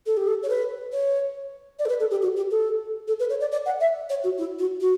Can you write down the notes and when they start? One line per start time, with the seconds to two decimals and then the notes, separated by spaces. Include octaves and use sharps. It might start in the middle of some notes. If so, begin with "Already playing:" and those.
0.06 A4
0.17 G4
0.27 A4
0.43 C#5
0.49 B4
0.92 C#5
1.79 D5
1.85 A4
1.89 B4
2.00 A4
2.11 G4
2.22 F#4
2.36 G4
2.51 A4
3.08 A4
3.19 B4
3.30 C#5
3.41 D5
3.52 D5
3.66 F#5
3.80 E5
4.09 C#5
4.24 F#4
4.38 E4
4.59 F#4
4.81 F#4